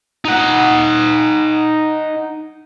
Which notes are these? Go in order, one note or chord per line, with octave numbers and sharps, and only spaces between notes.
D#4 F#5